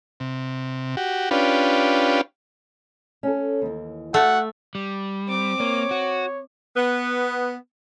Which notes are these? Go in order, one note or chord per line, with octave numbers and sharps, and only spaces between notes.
C3
F#4 G4
C#4 D4 F4 G4 B4
C#4 A4
D#2 E3
A3 F#4 F#5
G3
C4 D6
A#3 C#5
F#4
B3